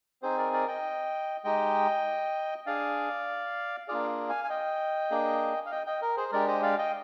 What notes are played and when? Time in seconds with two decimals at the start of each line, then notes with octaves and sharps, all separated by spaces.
0.22 C4 D#4 G#4 C5
0.38 A#4 D5
0.53 A#4 D5
0.68 D#5 G5
1.44 G#3 D#4 G4 D#5 G5
2.66 D4 G#4 D5 F5
3.88 A#3 D4 F4 G#4 D5 F5
4.29 F5 G#5
4.44 G#5
4.49 D#5 G5
5.11 A#3 D4 G#4
5.66 F5
5.71 D#5 G5
5.86 D#5 G5
6.02 A#4
6.17 G#4 C5
6.32 G#3 D4 G4 A#4 D5
6.48 C5 D#5
6.63 D5 F5
6.78 D#5 G5